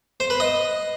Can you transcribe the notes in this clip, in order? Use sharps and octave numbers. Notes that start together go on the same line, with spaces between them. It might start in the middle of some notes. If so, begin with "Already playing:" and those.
C5
B4
D#5